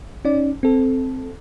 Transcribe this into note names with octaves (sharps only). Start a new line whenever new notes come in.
C#4 D#4 D5
C4 A4